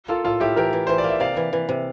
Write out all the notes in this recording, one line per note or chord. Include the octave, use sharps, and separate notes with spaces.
A#3 F4 A4
A2 F4 A4
A2 E4 G4
E3 G4 A#4
E3
E3 C5
D5
A#3 E5
C3 D5 F5
E3
E3
C3